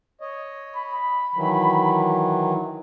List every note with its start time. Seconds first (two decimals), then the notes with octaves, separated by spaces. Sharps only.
0.21 C#5 D#5
0.77 B5
1.36 D#3 E3 F#3